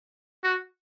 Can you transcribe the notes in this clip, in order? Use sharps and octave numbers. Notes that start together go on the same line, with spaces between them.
F#4